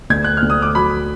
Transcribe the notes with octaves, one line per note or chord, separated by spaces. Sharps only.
D2 G#6
F#6
F6
D2
D#6
D6
F#3 B5